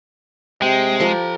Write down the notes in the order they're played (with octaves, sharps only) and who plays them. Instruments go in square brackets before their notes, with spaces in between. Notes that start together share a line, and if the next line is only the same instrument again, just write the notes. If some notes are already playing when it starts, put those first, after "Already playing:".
[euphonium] C3 [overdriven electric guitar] G#3 [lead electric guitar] G5
[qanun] F3 G4 [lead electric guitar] A4 A#5